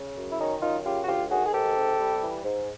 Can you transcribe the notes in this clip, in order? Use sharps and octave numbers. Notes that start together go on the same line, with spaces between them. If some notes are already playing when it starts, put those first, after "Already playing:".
Already playing: C#3
F#2
E4
D#3 C#4 D#4
F#2 D#4 F4
C#3 F4 G4
F#4
D2 F4 G4
D#3 F#4 G#4
G#4
G#2 G4 A4
C3
G3
E3
G#2